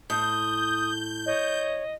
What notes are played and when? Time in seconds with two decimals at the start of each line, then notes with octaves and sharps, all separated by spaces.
0.10 A2 D#6 G6
1.26 C#5 D#5